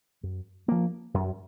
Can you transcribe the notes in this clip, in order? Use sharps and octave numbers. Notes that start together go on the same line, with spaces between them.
F#2
F3 A#3
F#2